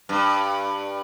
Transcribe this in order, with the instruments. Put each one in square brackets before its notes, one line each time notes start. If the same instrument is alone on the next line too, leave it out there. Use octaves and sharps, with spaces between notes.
[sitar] G2